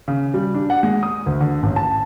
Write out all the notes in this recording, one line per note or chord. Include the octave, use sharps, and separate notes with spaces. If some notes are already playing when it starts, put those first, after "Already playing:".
C#3
G3
D4
F#5
G#3
D#6
D2
D3
A1
A5